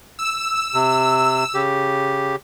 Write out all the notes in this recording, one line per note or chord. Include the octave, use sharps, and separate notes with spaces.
E6
C3
C#3 G4